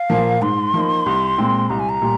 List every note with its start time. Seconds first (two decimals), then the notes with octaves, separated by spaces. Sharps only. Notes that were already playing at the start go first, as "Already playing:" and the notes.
Already playing: F5
0.10 A#2 F3 A#3
0.42 G#2 C6
0.74 F3 A#3 D#4
1.06 C2
1.38 A#2 G#3 C4
1.70 C2 A#5
1.79 G#5
1.89 A#5
2.02 A#2 G3